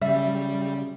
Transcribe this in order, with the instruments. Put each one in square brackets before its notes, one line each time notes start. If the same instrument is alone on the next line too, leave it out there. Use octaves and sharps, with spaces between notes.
[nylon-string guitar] C#3 F#3 [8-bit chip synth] G3 [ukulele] E5